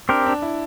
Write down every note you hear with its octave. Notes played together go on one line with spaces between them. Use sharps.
C4 D4 G4 A#4
D4
E4